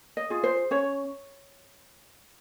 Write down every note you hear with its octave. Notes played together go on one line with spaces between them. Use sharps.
D#5
F4 G#4
C5
C#4 C#5